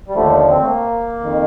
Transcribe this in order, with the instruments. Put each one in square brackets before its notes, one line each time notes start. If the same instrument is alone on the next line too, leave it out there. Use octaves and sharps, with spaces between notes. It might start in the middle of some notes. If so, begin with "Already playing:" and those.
[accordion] G3
D#2 D3 F3 A3
C4
A3
A#3
F2 D#3